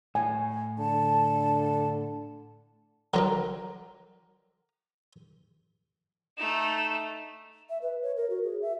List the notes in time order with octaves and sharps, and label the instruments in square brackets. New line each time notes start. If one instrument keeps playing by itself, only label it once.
[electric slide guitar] A2 [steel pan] G#5
[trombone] D3 [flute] A5
[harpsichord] D3 F#3 C4 [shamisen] A#4 D#5 A#5
[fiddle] A3 D#4 [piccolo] E7
[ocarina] E5
B4
C#5
A#4
F#4
G#4
E5